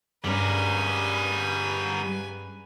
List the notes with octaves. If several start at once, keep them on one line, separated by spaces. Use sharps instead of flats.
G2 G3 G#3 C#4 A#4 B4 G#5